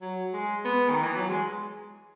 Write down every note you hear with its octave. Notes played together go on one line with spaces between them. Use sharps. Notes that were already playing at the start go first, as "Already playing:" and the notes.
F#3
G#3
B3
D#3
E3
F#3
G#3